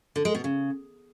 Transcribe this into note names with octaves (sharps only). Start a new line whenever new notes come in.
D3
G#3
B2
C#3